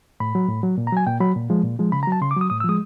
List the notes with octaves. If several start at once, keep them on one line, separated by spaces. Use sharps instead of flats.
A2 B5
F#3
A2
F#3
A#2
A#5
F#3 G#5
A#2 G5
F#3 B5
A#2
F3 G#3
A#2
F3 G#3
C#3 B5
A#5
F#3 A5
C#3 C6
D6
F#3 D#6
A2 D#6
E6
F3 G#3 D#6